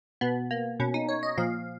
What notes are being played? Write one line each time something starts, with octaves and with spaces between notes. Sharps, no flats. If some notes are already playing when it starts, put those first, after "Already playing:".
B2 B3
A#3
B2 C#4
D#4
C#5
D#5
A#2 F3 F5